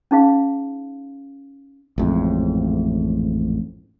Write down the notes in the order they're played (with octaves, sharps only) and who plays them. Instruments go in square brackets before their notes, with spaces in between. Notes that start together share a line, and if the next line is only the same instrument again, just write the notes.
[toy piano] C#4 D#4 G#4 F5
[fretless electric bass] A1 F2 G#2